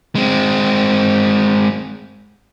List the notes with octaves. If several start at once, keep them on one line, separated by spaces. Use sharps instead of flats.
G#3 C4